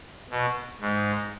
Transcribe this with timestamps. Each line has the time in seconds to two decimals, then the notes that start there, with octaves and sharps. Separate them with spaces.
0.30 B2
0.81 G#2